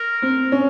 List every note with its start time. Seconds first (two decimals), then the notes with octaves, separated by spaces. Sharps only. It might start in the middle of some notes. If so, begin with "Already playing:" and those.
Already playing: A#4
0.22 C4
0.52 C#4